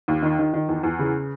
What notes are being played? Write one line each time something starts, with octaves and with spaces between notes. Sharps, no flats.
D#2
D#3
D#3
D#3
E2
E2
C#3